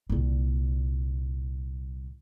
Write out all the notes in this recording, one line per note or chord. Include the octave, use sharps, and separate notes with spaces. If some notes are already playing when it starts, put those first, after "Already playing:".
C2 A#2